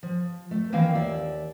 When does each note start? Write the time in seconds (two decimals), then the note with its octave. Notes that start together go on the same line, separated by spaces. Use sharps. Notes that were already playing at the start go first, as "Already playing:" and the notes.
0.03 F3
0.51 A3
0.72 D#3 E3 A#3 C4 F5 G5
0.95 D#2 D5 E5